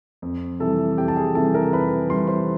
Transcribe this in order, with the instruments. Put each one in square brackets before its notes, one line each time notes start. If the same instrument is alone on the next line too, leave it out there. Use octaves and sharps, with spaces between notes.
[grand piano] F2
C3 E3 G3 A4 A5
F2 G4 G5
A5
G#4 G#5
C3 E3 G3 A4 A5
A#4 A#5
F2 B4 B5
C3 E3 G3 C6
C5 C6